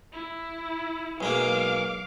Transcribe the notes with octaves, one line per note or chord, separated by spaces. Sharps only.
E4
B1 G#3 A#3 F5 D6